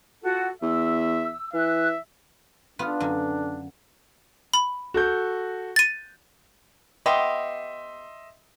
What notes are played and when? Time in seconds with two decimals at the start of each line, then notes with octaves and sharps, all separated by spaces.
0.22 F4 F#4 A4
0.62 E2 E5 E6
1.54 E3 E5 F#6
2.79 B3 D4 F4 B4
3.00 F#2 D3
4.54 B5
4.94 F#4 A4 G6
5.76 A6 D#7
7.06 B3 G4 D#5 E5 C6